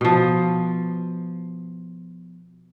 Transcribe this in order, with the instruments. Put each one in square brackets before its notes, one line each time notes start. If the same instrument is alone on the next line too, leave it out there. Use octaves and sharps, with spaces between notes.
[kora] B2 F3